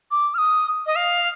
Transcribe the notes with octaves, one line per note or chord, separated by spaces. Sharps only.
D6
F6
D#6
D#5
F5